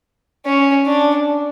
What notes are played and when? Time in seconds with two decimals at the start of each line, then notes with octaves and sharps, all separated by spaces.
0.46 C#4
0.86 D4